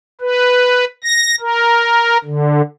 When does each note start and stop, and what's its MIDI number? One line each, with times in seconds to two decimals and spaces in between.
0.21 0.85 71
1.04 1.35 94
1.41 2.17 70
2.24 2.62 50